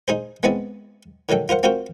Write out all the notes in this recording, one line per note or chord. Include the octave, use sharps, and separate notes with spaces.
D#4 G#4 C5
G#3 B3 C4 E4 G#4 D5
D3 D#3 F#3 A4 G5
F4 A#4 C5 F#5
C4 F4 F#4 A#4 C5 G5